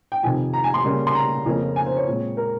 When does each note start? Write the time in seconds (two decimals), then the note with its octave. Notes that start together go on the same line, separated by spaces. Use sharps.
0.12 G5
0.23 F2 C3 D#3 G#5
0.54 A#5
0.64 G#5
0.74 C6
0.84 C#3 G3 A#3 C#4
1.07 C6
1.15 A#5
1.46 F2 C#3 F3 A#3 C#4
1.76 G#5
1.86 C5
1.96 C#5
2.06 A#2 G#3 C4
2.37 A#4